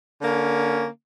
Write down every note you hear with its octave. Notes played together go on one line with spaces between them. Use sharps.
D3 A#3 C#4